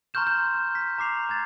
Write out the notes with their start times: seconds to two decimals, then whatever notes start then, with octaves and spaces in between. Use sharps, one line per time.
0.14 A#5 C6 C#6 F6 G6 E7
0.27 G6
0.54 F6
0.75 B6
0.98 A#5 D6 C7 F7
1.29 A#5 G#6 A6